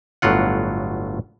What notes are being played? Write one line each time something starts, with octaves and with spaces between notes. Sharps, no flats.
G1 A2 F#3 F4 F#5